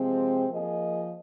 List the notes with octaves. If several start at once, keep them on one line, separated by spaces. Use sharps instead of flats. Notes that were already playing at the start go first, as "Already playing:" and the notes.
Already playing: C3 F3 G#3 C4
F3 A#3 G#4 D#5